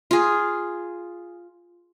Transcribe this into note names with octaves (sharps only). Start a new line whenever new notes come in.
F4 G#4